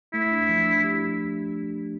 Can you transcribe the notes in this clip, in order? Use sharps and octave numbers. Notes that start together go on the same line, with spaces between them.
A3 E4
D4
F3
D4
G4